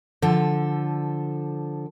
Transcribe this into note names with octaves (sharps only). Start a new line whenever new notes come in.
D3 F3 A4